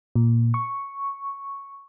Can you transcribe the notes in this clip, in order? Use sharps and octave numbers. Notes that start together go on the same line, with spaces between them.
A#2
C#6